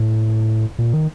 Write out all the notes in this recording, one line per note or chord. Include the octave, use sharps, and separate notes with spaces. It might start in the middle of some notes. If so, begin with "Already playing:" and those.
Already playing: A2
A#2
D#3